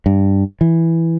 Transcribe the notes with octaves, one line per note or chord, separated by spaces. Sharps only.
G2
E3